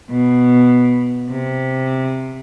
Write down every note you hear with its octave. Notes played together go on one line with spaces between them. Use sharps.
B2
C3